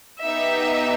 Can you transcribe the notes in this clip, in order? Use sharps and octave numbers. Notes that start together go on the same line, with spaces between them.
B3 D#4 G4 E5